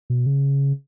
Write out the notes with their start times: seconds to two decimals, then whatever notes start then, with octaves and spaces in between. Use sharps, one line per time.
0.10 B2
0.26 C#3